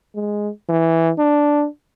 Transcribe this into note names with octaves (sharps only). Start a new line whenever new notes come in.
G#3
E3
D4